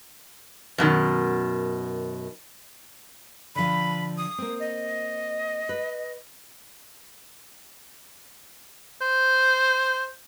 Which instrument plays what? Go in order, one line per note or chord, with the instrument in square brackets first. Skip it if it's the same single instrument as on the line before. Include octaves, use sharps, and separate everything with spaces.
[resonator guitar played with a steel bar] F#2 B2 D#3
[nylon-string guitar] D3 F3 [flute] B5
[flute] D#6
[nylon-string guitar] A#3 C4
[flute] D#5
[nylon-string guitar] B4
[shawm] C5